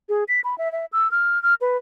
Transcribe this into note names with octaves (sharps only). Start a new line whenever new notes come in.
G#4
B6
B5
E5
E5
E6
F6
F6
B4